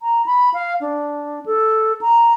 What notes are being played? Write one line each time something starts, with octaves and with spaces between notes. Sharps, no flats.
A#5
B5
F5
D4
A4
A#5